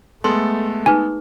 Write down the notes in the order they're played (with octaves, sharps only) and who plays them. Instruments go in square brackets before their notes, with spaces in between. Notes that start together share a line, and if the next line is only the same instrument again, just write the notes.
[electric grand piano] G#3 B3 A4 [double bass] A3 [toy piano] C6
[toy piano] D#4 G#4 B4 [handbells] G#5